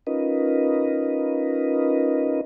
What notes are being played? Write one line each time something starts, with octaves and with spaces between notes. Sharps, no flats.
C#4 D#4 F4 A#4 B4 D#5